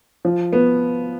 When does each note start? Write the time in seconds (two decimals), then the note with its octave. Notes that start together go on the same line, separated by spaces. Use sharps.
0.25 F3
0.53 B3